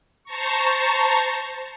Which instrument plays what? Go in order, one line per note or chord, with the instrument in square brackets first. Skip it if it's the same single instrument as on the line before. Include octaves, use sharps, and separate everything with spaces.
[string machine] C5 A5 A#5 C#6